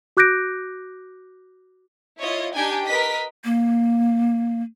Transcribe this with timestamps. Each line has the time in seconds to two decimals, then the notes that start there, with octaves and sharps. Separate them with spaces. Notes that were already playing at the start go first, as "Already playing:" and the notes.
0.17 F#4 D6 F#6 G6 A#6 D7
2.20 E4 F4 C#5 D#5
2.53 D4 D#4 G4 G5 G#5
2.85 A#4 B4 D#5 B6
3.45 A#3